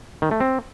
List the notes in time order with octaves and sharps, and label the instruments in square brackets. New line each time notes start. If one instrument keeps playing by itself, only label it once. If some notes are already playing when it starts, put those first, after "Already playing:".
[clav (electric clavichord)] D#3
A3
C4